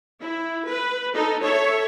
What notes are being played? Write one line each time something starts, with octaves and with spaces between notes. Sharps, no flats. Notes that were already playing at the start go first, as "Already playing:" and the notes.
E4
B4
D#4 A4
A4 C#5 E5